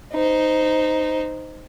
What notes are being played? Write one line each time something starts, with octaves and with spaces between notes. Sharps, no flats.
D#4 C5